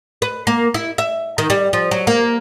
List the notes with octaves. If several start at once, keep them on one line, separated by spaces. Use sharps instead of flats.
B4
A#3
E4
E5
D#3
G3
F3
F#3
A#3